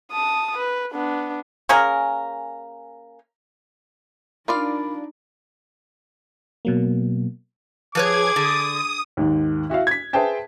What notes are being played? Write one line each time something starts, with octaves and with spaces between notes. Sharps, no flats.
A5 D#6
B4
B3 D4
A#3 C#4 G#4 A#4
D4 D#4 F4 A#4 D5 F5 B5
B2 F#3 A#3
F3 G#4 B4 C#5 D6 G#6
D3 D#6
D#2 G#2 D#3
E4 F#4 E5 F5
G#6 B6
G#4 B4 C5 E5 G5 A5